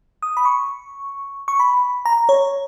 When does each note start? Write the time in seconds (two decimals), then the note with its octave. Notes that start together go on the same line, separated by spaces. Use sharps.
0.22 D#6
0.37 B5
0.45 C#6
1.48 C#6
1.60 B5
2.06 A#5
2.29 C#5